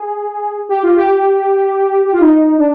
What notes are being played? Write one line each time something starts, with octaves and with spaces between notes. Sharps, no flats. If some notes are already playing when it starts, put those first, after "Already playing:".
Already playing: G#4
G4
F4
G4
G4
F4
D#4
D4